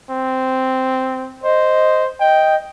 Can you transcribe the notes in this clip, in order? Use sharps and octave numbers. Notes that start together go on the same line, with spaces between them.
C4
C5 D#5
D#5 G5